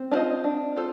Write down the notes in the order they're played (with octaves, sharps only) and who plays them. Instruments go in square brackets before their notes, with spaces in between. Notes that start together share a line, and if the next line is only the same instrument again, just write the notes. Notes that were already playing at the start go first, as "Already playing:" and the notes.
Already playing: [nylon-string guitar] C4
[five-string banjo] D4 F4 C5 D#5
D4
F4 A4 C5